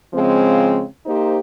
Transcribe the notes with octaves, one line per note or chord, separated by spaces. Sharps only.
C#3 F3 G#3 C4
A#3 D#4 G4 C5